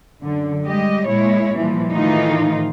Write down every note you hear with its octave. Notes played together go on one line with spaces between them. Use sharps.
F#2 D3
G3 G#3 G4 D#5
A#2 G#3 E4 C#5
A#2 E3 F3 G3
A2 D#3 E3 A3 D#4 F4